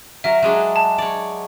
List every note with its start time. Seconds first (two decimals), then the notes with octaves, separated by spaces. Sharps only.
0.24 F#3 A#4 E5
0.42 F#3 G#3 D4
0.76 A5
0.98 C#5 D5